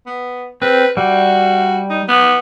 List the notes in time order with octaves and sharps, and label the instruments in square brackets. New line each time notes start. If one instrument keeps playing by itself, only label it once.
[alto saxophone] B3
[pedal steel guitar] C4 [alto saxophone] B4
[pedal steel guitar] G3 [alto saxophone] F#4
[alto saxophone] D#4
B3